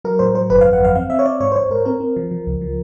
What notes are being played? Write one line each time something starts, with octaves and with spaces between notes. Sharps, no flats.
F#3 A#4
A2 C5
F#3 C5
G1 B4
F2 F5
F#5
G1 F5
C4 F5
C4 E5
C#5
C4 D5
G#2 C#5
C5
G#2 C#5
G#2 A#4
C4 A#4
C4
F3
F3
C#2
F3